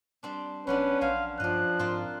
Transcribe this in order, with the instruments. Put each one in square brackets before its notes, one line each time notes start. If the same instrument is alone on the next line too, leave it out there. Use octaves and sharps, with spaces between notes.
[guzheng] G3 C4 D4
[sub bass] E1 [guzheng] F#3 B3 D4 [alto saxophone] C#4 [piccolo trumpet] B4
[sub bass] A#1 [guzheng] C5 G#5 [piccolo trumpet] F5
[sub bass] G2 [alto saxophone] F3 [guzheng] D4 D#5 [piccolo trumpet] F#6
[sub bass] G#2 [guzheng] C4 F4 A#4